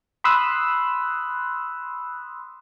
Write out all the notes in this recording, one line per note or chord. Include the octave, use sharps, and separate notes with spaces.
B5 C6 D#6 E6 F#6